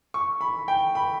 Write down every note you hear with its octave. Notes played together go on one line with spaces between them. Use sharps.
C#6
B5
G5
B5